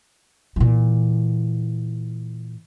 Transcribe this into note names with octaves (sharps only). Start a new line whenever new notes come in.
A#2 E3